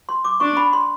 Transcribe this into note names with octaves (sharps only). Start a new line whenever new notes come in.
C6
D6
D4 C#6
B5
C6